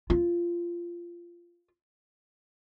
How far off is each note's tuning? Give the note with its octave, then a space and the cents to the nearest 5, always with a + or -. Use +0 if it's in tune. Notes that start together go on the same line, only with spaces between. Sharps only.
F4 -15